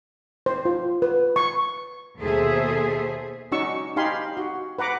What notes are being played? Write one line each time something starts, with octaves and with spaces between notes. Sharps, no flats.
C5
F4
B4
C#6
D#2 B2 G#4 A4 C5 E5
C#4 D#4 F#4 D5 C#6 E6
D#4 G4 F5 G#5 B5 C6
F#4
B4 F#5 A#5 D6